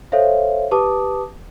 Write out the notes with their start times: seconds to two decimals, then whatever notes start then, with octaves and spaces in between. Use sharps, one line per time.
0.12 A4 C5 C#5 E5 F5
0.71 G4 B4 A5 D6 D#6